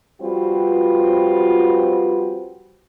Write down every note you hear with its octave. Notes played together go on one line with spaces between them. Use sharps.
F3 G3 C4 F4 F#4 B4